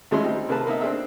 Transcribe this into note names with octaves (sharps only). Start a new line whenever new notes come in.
D#2 F3 G#3 C#4 E4 C6
G3 C4 D#4
C3 A#3 G#4 B4 A5
A#3 B3 D#4 E5
C4 D4 G#4 E5